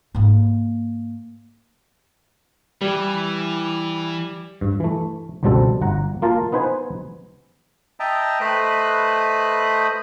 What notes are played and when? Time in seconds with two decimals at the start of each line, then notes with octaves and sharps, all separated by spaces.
0.15 G#2 A#3
2.81 E3 G3
4.61 G2
4.80 E3 A3
5.43 G1 C#2 B2 G3 C4 A4
5.81 G1 F#5 A#5
6.22 A#3 F4 A#4 F5 A5
6.52 B3 D#4 B4 C5 G#5
8.00 D#5 E5 G5 A5 A#5
8.41 A3 B4 C5 D#5 B5 F#6